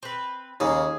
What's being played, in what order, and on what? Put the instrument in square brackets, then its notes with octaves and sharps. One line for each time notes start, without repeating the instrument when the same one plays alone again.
[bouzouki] C4 B4
[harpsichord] D#2 C#3 A#3 [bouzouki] G#4